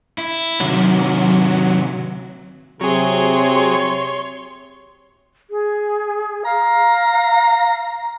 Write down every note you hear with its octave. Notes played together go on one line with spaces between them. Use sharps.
E4
C3 D#3 F#3
C3 F#3 C4 G#4 C#5 C6
G#4
F5 A#5